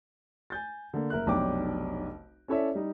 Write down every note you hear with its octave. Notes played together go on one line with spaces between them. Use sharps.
G#5 G6 A6
D3 A#3
F#1 A#4 E5 F#6
F1 B1 D4 C#5 G5 D6
C#4 E4 A4 C#5 D5 E5
G3 D#4